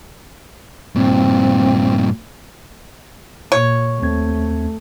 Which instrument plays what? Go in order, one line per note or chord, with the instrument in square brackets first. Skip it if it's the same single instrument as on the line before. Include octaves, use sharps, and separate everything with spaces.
[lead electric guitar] G2 A#2 [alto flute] C4
[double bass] A#2 [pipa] C#5
[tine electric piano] D#2 C4 G#6 [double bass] A3